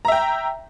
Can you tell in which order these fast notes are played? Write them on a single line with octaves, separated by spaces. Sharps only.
A#5 E5 G5